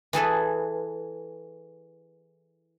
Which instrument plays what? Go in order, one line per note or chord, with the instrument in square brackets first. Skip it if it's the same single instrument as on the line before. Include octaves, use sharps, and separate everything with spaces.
[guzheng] E3 G#4 A4 B4